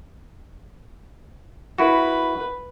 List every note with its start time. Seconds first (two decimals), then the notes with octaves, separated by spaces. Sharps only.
1.78 E4 F#4 B4